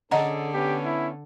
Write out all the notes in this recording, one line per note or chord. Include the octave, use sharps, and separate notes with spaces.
D3 C#4 G#4 A4 D#5 F#5 A#5
B3 C#4 G4
E4